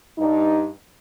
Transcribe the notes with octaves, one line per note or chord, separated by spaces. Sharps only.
G2 D#4